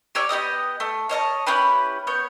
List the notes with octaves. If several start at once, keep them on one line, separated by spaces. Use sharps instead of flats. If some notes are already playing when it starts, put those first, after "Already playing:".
G4 C#5 D5 E6
B3 G4 D#5 D#6
A3
C#5 D#5 F5 A5
C#4 E4 G4 B4
B3 C#5 G6